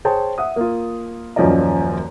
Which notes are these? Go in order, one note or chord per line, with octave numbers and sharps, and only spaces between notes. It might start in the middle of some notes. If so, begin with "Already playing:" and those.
G#4 C5 C#5 G5 A5
E5 F#5 D#6
A#3 F4
D#1 F#2 F3 C#4 D5 D#5